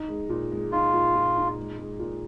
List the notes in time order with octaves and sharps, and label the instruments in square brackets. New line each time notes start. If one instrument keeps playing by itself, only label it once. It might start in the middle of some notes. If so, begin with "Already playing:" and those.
Already playing: [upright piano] D#4
G#3
A#2
G#3
[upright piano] D#4 [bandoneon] F4
[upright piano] A#2
A#2
D#4
G#3
G#3
A#2